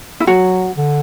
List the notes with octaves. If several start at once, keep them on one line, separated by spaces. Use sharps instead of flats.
E4
F#3 F#4
D3